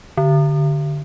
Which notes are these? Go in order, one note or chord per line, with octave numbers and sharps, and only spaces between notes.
D3